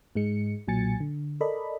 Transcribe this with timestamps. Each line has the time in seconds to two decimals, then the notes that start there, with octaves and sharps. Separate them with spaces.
0.15 G#2 G#3 C#7
0.67 B1 A#2 F#3 G#5 A6 C#7
1.00 D3
1.41 A4 A#4 D5 D#5 B5